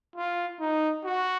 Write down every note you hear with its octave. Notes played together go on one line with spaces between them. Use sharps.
F4
D#4
F#4